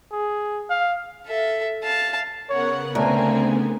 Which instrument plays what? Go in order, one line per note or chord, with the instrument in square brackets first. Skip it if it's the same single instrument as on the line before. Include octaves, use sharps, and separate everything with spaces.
[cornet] G#4
F5
[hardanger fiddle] A4 E5
F5 A5
[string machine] C#3 B3 [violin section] A#4 F#5 [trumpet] C#5
[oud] D2 [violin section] A#3 C4 G#5 [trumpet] A#5